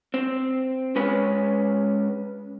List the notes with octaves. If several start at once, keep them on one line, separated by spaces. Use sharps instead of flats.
C4
G#3 C#4 B4